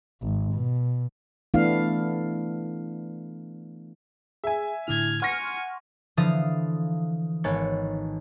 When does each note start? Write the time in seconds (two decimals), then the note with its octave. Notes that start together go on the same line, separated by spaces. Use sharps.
0.22 G#1
0.53 B2
1.54 E3 A3 B3 D4 E4 F5
4.44 G#4 E5 G#5
4.88 A2 D3 E4 F6 G#6
5.22 F#5 G#5 C6 C#6 F6 A#6 C#7
6.17 D3 E3 F3 F5 D#6 A6
7.44 G#1 D#3 B3 C#5 A6